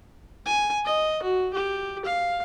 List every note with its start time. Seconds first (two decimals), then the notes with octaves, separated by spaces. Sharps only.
0.46 G#5
0.86 D#5
1.23 F#4
1.54 G4
2.05 F5